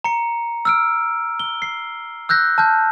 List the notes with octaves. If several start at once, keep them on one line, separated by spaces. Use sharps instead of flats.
A#5 C#7
E6 F6 D7
G7
C7
E6 F#6 G6 A#6
A5 F6 G6